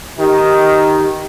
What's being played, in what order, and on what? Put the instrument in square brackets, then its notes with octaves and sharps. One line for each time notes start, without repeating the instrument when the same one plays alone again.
[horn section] D#3 [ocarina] G4